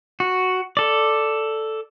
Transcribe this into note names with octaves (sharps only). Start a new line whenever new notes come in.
F#4
A4 D5